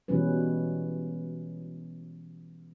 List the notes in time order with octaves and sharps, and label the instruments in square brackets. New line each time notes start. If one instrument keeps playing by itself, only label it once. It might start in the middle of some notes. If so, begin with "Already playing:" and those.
[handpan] B2 E3 G3 G#3 C#4 B4